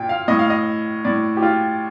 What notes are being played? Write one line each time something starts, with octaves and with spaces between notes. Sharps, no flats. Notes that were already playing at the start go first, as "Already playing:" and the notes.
Already playing: A#2 G5
F5
A2 D#5
F5
D#5
A2 D5
G4
F4